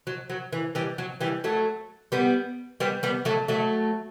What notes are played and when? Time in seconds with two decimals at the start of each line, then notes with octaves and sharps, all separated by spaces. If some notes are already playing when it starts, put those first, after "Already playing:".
0.07 F#3
0.30 F#3
0.52 E3
0.75 E3 G3
0.98 F#3
1.21 E3 G3
1.44 F#3 A3
2.12 G3 B3
2.80 G3 B3
3.03 G3 B3
3.25 F#3 A3
3.48 F#3 A3